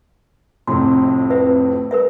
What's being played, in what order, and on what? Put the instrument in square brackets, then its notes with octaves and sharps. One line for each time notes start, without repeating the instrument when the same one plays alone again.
[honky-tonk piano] F2 A2 C3 [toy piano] C6
[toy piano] B4 E5
A#4 B4 E5